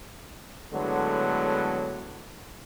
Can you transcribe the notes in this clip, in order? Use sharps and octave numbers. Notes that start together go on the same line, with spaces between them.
A2 D3 F#3 G#3 B3